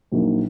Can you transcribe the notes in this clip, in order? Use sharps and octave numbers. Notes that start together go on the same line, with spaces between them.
A#1 A#2 F#3 A#3 D#4